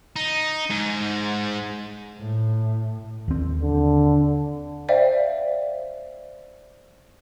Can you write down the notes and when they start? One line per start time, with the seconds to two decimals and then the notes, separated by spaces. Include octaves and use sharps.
0.16 D#4
0.70 G#2
2.19 A2
3.28 D#2 C4
3.61 D3
4.89 C5 D5 E5 F5 G5